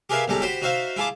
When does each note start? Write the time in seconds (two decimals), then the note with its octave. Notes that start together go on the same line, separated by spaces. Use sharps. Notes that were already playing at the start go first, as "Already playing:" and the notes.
0.09 G4 G#4 A#4 B4 E5 F5
0.28 B1 G3 G#3 G4 A4 A#5
0.42 F#4 G4 C5 B5
0.62 D#4 F#4 C5 E5 F5
0.96 E4 F4 G#4 A5 D6